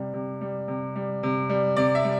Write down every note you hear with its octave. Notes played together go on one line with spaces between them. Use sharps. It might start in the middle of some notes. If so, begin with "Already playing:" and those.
Already playing: C3 G3
C3
G3
C3
G3
C3
G3
C3 D5
E5
G3